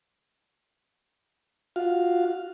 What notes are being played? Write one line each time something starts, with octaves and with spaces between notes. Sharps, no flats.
F4 F#4 F5